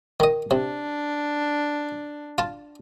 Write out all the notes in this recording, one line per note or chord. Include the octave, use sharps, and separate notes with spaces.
D#3 D#5
C3 D4
F4 A5